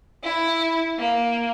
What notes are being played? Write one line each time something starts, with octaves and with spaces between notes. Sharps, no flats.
E4
A#3